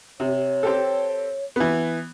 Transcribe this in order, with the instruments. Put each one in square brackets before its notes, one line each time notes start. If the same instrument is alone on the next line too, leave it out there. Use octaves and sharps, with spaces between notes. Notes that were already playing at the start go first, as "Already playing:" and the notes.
[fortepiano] C3 [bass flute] C#5
[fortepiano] C4 G4 A4
E3 B3